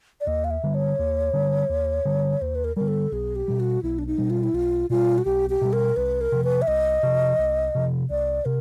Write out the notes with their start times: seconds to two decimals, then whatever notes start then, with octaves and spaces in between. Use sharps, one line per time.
0.20 D5
0.27 D#2 D#5
0.44 F5
0.50 E5
0.63 D3 G3
0.74 C#5
0.99 D#2
1.33 D3 G3
1.69 D#2
2.05 D3 G3
2.41 D#2 C5
2.55 B4
2.64 A#4
2.76 D3 G3 A#4
2.88 A4
3.12 B1 G#4
3.35 G4
3.48 B2 G3
3.60 F#4
3.83 B1 E4
3.98 D4
4.07 D#4
4.18 B2 G3
4.30 F4
4.43 E4
4.54 B1 F4
4.90 B2 G3 F4
5.18 F#4
5.25 B1 G4
5.50 G4
5.61 B2 G3
5.73 A#4
5.96 C2 B4
6.21 A#4
6.32 C3 F3
6.44 B4
6.62 E5
6.67 C2 D#5
7.03 C3 F3
7.39 C2
7.75 C3 F3
8.10 C2 D5
8.45 C3 A#4